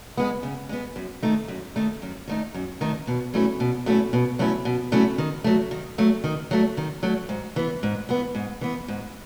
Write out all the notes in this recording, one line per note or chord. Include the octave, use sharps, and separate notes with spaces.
G#3 B3
C#3
G#3 B3
F#2
D#3 A3 D#4
F#2
D#3 A3 D#4
F#2
D#3 A3 D#4
F#2
D#3 A3 D#4
B2
F#3 A3 C#4 E4
B2
F#3 A3 C#4 E4
B2
F#3 A3 C#4 E4
B2
F#3 A3 C#4 E4
D#3
F#3 A3
D#3
F#3 A3
D#3
F#3 A3
D#3
F#3 A3
G#2
E3 B3
G#2
E3 B3
G#2
E3 B3
G#2